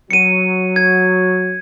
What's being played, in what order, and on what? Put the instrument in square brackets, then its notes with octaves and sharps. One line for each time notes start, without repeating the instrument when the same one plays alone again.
[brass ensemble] F#3 [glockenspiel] C#7 D#7
[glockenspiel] G#6